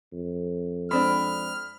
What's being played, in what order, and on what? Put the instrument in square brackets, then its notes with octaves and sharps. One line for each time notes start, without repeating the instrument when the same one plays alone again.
[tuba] F2
[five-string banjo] G#3 C4 D4 [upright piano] B5 [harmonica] F6